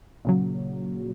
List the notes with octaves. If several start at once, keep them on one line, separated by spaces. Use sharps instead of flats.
A#2 C#3 F#3